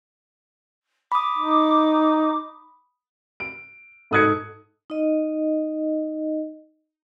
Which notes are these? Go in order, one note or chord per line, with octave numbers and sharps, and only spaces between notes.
B5 D6 D#6
D#4
D7
G#2 A4 D#6 F#6 G#6 C#7
D#4 D#5